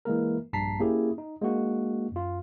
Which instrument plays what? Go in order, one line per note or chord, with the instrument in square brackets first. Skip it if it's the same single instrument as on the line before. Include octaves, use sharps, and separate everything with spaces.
[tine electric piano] E3 G#3 A#3 A#4
A#1 G2 A5 A#5 B6 C7
A#3 C#4 E4 G4 G#4
D#4
G#3 A#3 D4 F#4
F#2 F4